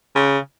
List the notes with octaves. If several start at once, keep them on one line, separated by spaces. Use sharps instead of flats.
C#3